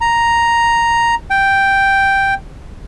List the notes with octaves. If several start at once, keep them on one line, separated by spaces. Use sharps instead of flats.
A#5
G5